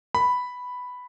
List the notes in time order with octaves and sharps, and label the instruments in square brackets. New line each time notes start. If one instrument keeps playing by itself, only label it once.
[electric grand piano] B5